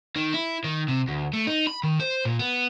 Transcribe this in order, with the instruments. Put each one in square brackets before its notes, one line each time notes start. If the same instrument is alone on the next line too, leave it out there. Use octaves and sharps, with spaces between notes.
[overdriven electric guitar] D#3
E4
D#3
C3
D2
A3
D#4
B5
D#3
C5
A#2
B3